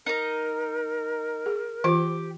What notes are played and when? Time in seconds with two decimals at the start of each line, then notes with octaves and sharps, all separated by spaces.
0.06 D#4 A#4 A#5
1.46 G#4
1.84 E3 F4 G4 C5